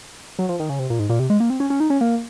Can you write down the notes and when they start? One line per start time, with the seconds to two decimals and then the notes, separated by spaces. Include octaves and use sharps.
0.39 F#3
0.49 F3
0.60 D#3
0.69 C#3
0.79 C3
0.90 A#2
0.99 G#2
1.09 A#2
1.19 C3
1.30 G#3
1.40 A#3
1.50 C4
1.60 C#4
1.70 C#4
1.80 D#4
1.90 C#4
2.01 A#3